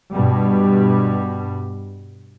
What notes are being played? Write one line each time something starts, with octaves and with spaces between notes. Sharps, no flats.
G2 B2 G3